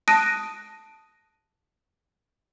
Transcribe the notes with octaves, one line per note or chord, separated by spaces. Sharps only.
A5 D#6 F#6 A#6 D7 D#7